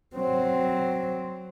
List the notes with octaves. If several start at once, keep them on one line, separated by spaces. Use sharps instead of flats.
F#3 C4